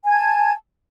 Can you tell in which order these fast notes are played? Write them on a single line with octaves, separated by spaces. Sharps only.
G#5 G#6 A5